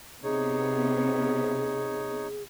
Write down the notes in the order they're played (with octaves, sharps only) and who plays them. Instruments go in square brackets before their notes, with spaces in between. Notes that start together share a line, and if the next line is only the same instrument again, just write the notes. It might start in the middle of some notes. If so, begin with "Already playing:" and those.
[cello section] C3 B3 [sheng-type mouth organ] D#4 C#5 [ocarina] G#4